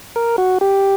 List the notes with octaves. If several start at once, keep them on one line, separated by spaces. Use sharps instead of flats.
A#4
F#4
G4